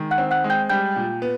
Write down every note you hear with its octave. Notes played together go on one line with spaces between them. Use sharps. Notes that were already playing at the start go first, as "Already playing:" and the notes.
Already playing: D#3 G#3
F#5 F#6
C4
F#5 F#6
G#3
G5 G6
G3 G5 G6
A#2
B3